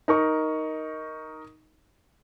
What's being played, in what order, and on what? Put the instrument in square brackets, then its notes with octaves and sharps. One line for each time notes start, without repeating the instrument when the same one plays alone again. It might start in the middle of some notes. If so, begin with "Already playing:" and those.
[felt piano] D#4 A#4 C#6